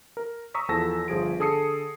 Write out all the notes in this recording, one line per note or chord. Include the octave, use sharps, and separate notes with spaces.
A#4
A#5 C#6 D#6 E6 B6
E2 F3 A4 A5 E6 A#6
G1 F3 G#4 D7
D3 G#4 A4 D#6 C7 C#7